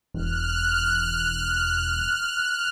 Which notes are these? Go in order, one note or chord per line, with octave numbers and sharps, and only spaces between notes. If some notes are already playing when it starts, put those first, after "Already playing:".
E1 F6 F#6